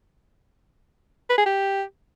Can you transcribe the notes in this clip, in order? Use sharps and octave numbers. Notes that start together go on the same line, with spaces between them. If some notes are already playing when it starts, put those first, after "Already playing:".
B4
G#4
G4